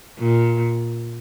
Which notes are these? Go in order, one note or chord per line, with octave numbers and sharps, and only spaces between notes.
A#2